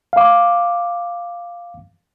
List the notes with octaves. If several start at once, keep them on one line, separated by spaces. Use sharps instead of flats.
F5 D6